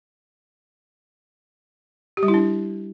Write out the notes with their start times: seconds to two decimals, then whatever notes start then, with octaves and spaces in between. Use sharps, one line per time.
2.17 G4
2.23 G3
2.28 E4
2.34 D4